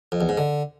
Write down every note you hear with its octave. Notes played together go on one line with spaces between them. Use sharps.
F2
E2
G#2
D3